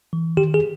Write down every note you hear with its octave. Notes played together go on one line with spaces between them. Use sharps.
E3
D#3 G4
G#4